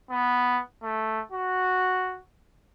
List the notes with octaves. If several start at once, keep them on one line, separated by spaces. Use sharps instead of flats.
B3
A3
F#4